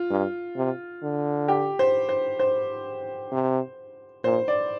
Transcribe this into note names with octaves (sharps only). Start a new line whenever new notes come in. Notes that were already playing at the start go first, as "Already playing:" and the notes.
Already playing: F4
G2
C3
D3
G4
C5
C5
C5
C3
A#2 C5
D5